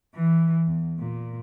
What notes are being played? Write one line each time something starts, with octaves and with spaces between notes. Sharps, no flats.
E3
E2
A#2